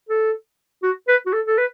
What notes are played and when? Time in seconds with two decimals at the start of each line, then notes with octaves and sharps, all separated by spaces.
0.09 A4
0.83 F#4
1.08 B4
1.26 F#4
1.33 A4
1.46 A4
1.58 B4